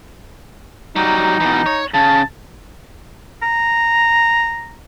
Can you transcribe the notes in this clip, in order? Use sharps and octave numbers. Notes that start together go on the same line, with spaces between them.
F#3 G3 D#4
B2 E3
C#5
C#3 A5
A#5